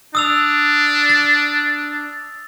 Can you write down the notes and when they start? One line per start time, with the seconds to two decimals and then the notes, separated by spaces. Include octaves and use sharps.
0.15 D4 D#6 E6 F7
1.09 A6